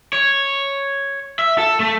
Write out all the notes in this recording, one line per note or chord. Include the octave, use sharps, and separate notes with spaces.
C#5
E5
A4
A3